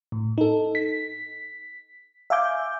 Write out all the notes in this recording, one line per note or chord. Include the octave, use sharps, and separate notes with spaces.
A2
D#4 A4
B6
E5 F5 G#5 D6 G6